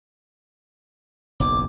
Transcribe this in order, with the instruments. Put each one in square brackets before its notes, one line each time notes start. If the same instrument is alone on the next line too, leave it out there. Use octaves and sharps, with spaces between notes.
[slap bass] F#1 B1 E2 [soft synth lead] D6